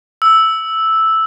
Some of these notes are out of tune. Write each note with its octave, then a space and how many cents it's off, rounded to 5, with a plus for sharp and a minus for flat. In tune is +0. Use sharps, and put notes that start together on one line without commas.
E6 -5